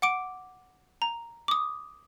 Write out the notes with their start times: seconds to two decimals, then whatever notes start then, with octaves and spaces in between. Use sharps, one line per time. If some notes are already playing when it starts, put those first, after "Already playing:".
0.02 F#5 D6 D7
1.02 A#5
1.48 D6 D#6